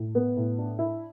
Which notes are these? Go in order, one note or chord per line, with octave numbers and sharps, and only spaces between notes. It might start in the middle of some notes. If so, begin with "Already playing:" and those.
Already playing: A2
B3
A2
D4
E4